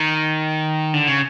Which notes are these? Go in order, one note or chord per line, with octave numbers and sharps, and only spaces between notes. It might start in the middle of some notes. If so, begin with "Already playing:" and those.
Already playing: D#3
D3
C#3